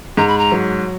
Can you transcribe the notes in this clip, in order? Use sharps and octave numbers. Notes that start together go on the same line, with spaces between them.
G#2 A#5
B5
A#5
F#3